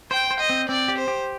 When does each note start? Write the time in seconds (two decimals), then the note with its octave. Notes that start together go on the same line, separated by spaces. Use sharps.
0.11 C5 G5
0.31 C5
0.40 D#5
0.50 C4
0.69 C4 D5
0.88 G4
0.98 C5
1.08 G4